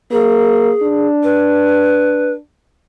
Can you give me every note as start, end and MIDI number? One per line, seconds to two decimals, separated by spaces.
0.12 0.71 58
0.12 1.08 68
0.82 2.39 62
1.24 2.33 71